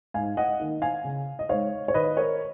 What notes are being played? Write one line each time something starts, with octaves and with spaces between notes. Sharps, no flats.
G#2 F5 G#5
D#5 F#5
D#3 A#3 D#4
F5 G#5
C#3
D#5
G#3 D#4 C#5 F5
C#5
D#3 B4 D#5
A#4 C#5